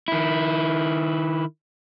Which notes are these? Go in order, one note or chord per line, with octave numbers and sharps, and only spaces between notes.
D#3 E4